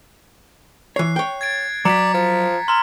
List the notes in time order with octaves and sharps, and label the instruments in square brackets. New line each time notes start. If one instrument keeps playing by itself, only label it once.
[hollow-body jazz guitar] E3 C#5 [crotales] F#6 C7
[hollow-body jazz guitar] C#5 G5
[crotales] G#6 A6 D7
[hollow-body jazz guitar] F#3 [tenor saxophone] D5 [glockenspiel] A#5 [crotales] B6 C#7
[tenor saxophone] F3 [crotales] A6
[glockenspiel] A#5 C6 [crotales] E6 F6